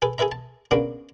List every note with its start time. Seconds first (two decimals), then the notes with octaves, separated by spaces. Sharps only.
0.02 G#4 A4 B4
0.18 G#4 A4 B4 E5 A#5
0.32 A5
0.71 C#3 A#3 B3 D4 F#4